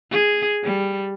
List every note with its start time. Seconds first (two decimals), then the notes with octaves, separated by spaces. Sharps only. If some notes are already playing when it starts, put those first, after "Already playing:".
0.11 G#4
0.64 G3